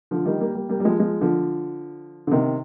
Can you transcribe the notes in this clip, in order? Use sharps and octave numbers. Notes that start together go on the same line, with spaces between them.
D3 F3
D#3 G3
G3 A#3
G3 A#3
G3 A#3
G3
F3 G#3
F3 G#3
D3 F3
D3
C3 D#3